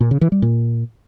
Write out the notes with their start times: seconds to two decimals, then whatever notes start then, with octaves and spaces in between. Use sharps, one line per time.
0.01 A#2
0.11 C#3
0.21 E3
0.32 G3
0.42 A#2